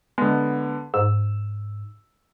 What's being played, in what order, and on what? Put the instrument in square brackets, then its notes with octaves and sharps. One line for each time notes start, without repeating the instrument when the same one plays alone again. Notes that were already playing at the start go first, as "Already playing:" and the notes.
[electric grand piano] D3 B3 [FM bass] G#3
[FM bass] G#2 [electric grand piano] E6